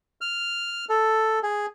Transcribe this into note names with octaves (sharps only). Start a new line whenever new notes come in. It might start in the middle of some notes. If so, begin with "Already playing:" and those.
F6
A4
G#4